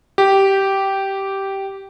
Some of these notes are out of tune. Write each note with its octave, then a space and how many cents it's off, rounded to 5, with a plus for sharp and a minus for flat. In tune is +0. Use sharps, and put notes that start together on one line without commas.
G4 -10